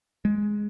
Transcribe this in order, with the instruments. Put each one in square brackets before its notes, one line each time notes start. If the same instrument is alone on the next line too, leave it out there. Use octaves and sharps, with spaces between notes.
[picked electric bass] G#3